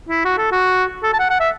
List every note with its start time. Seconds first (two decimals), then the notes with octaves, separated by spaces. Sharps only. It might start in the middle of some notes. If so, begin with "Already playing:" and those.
0.09 E4
0.25 F#4
0.38 A4
0.52 F#4
1.03 A4
1.13 A5
1.19 F#5
1.30 F#5
1.40 E5